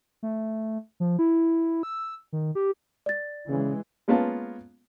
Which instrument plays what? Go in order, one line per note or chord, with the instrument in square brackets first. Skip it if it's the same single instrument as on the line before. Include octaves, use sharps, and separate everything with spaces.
[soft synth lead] A3
F3
E4
E6
D#3
G4
[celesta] D5 A6
[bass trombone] C#3 [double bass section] E3 G#3
[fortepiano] G#3 A#3 B3 C#4 F4 A5